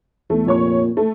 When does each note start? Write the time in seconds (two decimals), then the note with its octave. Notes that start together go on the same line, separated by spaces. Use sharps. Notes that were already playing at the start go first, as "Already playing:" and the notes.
0.30 E2 A3
0.46 F1 A#2 C#5 C#6
0.97 A3